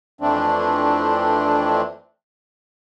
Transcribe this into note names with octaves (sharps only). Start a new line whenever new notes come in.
F2 E3 A3 C4 D4